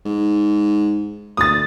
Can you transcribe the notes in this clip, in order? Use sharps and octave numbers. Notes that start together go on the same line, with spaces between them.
G#2
D2 D#6 A6